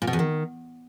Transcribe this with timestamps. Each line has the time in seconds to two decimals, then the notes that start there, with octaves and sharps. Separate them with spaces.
0.02 A#2
0.07 B2
0.13 E2
0.19 D#3